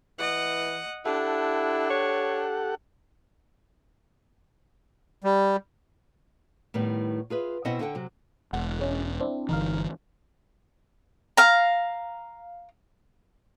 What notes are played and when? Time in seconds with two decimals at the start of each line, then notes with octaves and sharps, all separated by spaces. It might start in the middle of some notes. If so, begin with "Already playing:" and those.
0.19 E3 D#5 F#5
1.06 D4 E4 G4 A4 F#5
1.90 C#5
5.24 G3
6.74 A2 D#3 G3 B3
7.30 F4 G#4 B4 E5
7.65 B2 C4 E4 C5 D#5 F#5
7.79 D3 E4 A4 C#5 F#5 G5
7.95 C3 F#3
8.53 E1 F#5
8.79 G#3 C#4
9.20 C4 D4 E4
9.49 G1 D3 E3 D#4 A#4 F5
11.37 F5 A#5